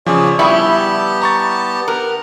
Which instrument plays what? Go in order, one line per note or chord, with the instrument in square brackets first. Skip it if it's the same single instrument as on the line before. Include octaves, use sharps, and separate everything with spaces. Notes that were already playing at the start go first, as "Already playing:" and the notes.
[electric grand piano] C#3 F3 [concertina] G#4 C#5 D5
[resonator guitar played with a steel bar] G3 E4 [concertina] B3 G4 A5 [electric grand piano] B5 C#6 D#6
[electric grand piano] A#5 C#6 A6
[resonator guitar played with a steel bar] A#4 [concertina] F#5